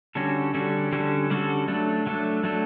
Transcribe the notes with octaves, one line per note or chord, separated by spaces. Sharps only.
D3 G3 C#4 F#4 A4
D3 G3 C#4 F#4 A4
D3 G3 C#4 F#4 A4
D3 G3 C#4 F#4 A4
F#3 A3 D4 A4
F#3 A3 D4 A4
F#3 A3 D4 A4